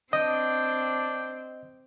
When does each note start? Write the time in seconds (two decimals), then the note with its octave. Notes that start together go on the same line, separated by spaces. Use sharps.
0.13 C4 D4 D#5 G5